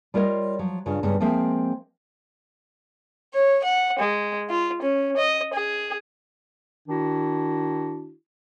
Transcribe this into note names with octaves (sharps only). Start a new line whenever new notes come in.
G3 F4 A#4 C#5 D#5
F3 F#3
G2 C#3 F4
G2 C#3 G#3 B3
F3 G#3 A#3 C4 E5
C#5
F#5
G#3
F4
C#4
D#5
G#4
D#3 D4 E4 F#4